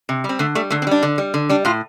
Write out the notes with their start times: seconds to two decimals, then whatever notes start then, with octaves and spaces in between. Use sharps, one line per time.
0.09 C3
0.24 G3
0.29 C4
0.39 D3 A3
0.55 G3 A3
0.70 D3 A3
0.82 C4
0.87 G3 D4
1.03 D3
1.18 G3
1.34 D3
1.49 G3 D4
1.65 A2 F4